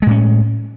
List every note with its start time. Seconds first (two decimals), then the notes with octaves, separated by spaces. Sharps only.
0.02 G#3
0.07 A2
0.11 C#4